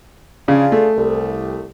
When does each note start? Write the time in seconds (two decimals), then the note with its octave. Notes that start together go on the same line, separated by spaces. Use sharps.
0.48 C#3 D4 F4 G#4
0.72 A3
0.96 C2